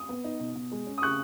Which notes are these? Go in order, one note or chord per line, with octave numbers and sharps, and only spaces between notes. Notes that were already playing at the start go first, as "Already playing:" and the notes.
Already playing: D#6
B3
D#4
B2
B2
G#3
C#4
D#6
C#3 C#6 F#6